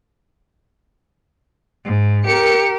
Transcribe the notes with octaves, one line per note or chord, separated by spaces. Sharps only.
G#2
G4 A#4 C#7